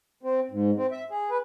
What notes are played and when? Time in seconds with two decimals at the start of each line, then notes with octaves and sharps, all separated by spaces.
0.23 C4
0.51 G#2
0.76 C4
0.91 E5
1.10 G#4
1.30 B4